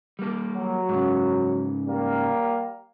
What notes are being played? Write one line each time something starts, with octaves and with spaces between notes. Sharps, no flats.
G3 A#3
F#3
G#2 C#3
G3 A#3